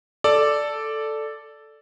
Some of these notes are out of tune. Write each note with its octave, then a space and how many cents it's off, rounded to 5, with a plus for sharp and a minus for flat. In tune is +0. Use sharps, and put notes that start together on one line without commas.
A4 +0 D5 +0